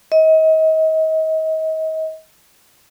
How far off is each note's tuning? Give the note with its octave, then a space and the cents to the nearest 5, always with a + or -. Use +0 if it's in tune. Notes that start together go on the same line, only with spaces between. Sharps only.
D#5 +35